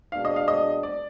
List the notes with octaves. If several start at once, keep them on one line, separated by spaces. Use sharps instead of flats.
B2 G#3 D4 F5
D#5
F5
D#5
D5